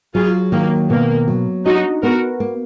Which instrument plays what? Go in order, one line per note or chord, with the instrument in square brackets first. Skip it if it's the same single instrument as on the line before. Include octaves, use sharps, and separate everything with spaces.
[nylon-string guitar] F#3 [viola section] F4 G#4
[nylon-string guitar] D#3 [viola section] A#3
[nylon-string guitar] B2 [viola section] A#3
[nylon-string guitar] F#3
[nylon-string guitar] D4 [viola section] D#4 F#4
[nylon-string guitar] B3 [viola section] F#4 A#4
[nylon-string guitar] A#3